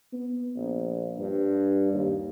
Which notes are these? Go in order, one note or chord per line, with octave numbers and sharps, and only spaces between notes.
B3
A#1
G2
D#2